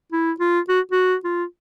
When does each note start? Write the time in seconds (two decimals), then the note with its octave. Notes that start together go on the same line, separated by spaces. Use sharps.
0.12 E4
0.40 F4
0.69 F#4
0.92 F#4
1.24 F4